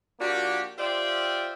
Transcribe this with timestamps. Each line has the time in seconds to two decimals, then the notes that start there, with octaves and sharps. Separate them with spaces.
0.20 F3 A#3 D4 F#4 G4
0.78 F4 G4 C5 D5 E5 G5